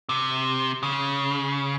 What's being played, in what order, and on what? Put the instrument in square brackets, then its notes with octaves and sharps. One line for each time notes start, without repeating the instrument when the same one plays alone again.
[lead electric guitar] C3
C#3